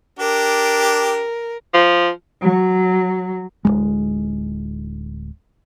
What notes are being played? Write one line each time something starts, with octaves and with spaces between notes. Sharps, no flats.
D4 G4 A#4
F3
F#3
D1 B1 G#3